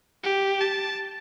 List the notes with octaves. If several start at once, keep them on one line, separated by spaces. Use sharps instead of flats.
G4
A5